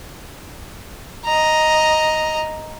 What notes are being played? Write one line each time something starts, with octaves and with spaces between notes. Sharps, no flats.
D#5 A#5